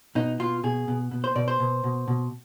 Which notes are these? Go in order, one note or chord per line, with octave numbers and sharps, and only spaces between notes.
B2 D#4
B2 F4
B2 G#4
B2
B2
C5
B2 D5
C5
B2
B2
B2